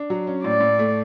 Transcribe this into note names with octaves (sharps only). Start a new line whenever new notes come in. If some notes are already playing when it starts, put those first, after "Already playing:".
Already playing: D4
F#3
C#4
A2 D5
A2
A3